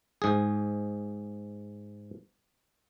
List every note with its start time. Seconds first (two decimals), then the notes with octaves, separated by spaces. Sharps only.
0.22 G#2 G#4